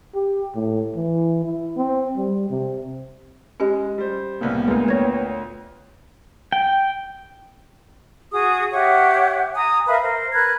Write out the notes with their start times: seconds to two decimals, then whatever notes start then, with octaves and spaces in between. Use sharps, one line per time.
0.15 G4
0.55 A2
0.96 E3
1.44 E4
1.77 C4
2.17 G3
2.50 C3
3.60 G#3 C#4 G4 D#5
3.98 G3 C5
4.41 C2 A2 C#3 A#3 B3
4.68 D2 A#2 G#3 B4
4.88 B4 C#5 G5 G#6 A#6
6.52 G5
8.32 F#4 G#4 D#6
8.72 G4 C#5 E5 F#5
9.54 G#5 A#5 D#6
9.86 A#4 B4 E5 F5
10.01 A#4 C5
10.32 A#4 B4 F#6 G#6